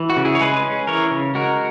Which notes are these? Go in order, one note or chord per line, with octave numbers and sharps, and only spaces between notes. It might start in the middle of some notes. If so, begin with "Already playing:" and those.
Already playing: E3
F#4
C#3
E4 G#4
C#5
G#3 G#4 B4
C#4
E3 A#4 C#5
C#3
G#3 F#4 A#4